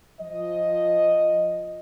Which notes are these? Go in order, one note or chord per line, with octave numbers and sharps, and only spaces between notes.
F3 D#5